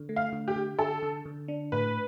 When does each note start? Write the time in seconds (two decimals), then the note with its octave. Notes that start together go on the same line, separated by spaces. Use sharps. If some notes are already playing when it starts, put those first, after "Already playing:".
Already playing: D3
0.09 A3
0.16 F5
0.32 D3
0.48 G4
0.56 D3
0.79 D3 A4
1.02 D3
1.25 D3
1.48 D4
1.72 A2 B4